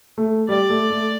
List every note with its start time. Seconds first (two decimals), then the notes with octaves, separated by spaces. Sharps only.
0.18 A3
0.49 G3 D5
0.70 A3
0.90 A3